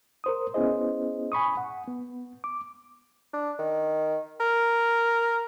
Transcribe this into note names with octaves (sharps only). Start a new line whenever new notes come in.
A#4 C5 D#6
B3 C#4 E4 G#4 C5 D#5
G#5 B5 C#6 D#6
F#5
B3
D6
D4
D#3
A#4